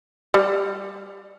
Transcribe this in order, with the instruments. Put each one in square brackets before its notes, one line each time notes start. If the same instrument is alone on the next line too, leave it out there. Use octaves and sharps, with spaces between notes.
[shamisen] G3